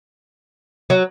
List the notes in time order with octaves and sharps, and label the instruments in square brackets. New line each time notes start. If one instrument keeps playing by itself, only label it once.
[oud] F#3